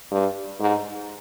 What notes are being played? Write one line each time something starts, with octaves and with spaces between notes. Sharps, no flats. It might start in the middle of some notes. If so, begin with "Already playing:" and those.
G2
G#2